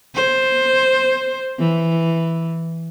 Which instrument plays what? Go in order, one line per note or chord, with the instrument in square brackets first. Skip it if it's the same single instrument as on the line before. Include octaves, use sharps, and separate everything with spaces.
[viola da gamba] C5
E3